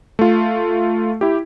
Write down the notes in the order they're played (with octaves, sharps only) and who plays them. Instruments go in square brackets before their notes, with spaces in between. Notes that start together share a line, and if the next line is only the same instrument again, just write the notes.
[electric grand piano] A3 F4
E4 G4